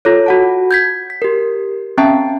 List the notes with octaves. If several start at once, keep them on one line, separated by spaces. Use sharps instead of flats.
F4 A4 C#5
F#4 F#5 A5
G6 G#6 B6
B6
G4 A#4
C4 C#4 E5 G5 A5 A#5